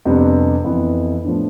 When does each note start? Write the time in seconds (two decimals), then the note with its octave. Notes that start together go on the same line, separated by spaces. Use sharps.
0.05 F2 C3 G3 B3 D4
0.65 F2 E3 B3 E4
1.24 A2 F3 B3 D4